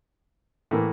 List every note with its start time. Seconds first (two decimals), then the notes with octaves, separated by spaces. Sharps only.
0.71 A2 E3 A#3